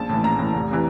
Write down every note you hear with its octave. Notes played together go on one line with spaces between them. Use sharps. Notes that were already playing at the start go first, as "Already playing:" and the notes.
Already playing: A#1 A5
A2 E3
A#1 A#5
A2 E3
F1
C3 E3